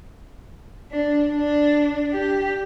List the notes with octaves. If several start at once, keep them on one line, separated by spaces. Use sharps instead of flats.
D4
D4
G4